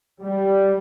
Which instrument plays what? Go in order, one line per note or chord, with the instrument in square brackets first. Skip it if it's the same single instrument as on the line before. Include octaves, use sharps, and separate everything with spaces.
[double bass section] G3